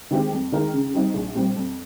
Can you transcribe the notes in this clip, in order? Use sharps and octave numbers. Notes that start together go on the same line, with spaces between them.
D#3 G#3 C4 G4
F2
D#3 G#3 D#4 A#4
C#3
G3 C4 D#4
A#1
A#2 G3 C4
F2